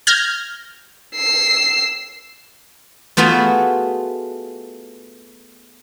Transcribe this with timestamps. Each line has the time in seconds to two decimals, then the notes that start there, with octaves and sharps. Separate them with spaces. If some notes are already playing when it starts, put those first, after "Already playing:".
0.07 F6 G6 G#6 A#6
1.16 E6 C7
3.17 A3 B3 F4 F#4 G#4